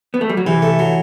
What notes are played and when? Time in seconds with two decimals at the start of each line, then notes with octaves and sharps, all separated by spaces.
0.14 B3
0.21 A3
0.29 G3
0.37 F#3
0.46 C3 E3
0.62 A3
0.79 F#3